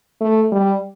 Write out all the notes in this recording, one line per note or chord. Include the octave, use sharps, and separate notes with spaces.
A3
G3